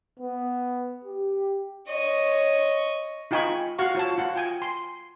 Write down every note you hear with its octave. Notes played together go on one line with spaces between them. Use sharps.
B3
G4
C#5 D#5
D#4 F4 G5 G#5 B5 C#6
F#4 F5 F#5 C#6
F4 C#5 A5
F4 F#5
G5 G#5
C6